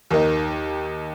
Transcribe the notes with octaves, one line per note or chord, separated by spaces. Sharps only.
D#2 D#3 A#3 D#4